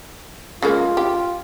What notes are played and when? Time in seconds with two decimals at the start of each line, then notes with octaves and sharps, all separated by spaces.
0.62 C#3 G#3 A#3 F4
0.97 G4